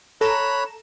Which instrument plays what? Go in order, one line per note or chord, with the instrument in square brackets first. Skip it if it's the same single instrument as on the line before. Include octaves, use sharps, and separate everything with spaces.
[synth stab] A4 A#5 E7 [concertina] C#5 B5 F#6